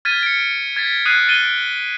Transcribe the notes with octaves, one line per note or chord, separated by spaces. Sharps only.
F6 G#6 A6 B6 D#7
C#7 D7
G#6 A6 B6
D#6 F#6 G#6 C7 D#7
A6 D7 D#7 G7